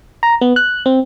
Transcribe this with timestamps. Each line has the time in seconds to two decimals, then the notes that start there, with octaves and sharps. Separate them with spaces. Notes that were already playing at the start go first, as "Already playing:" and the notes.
0.23 A#5
0.41 B3
0.56 F#6
0.86 C4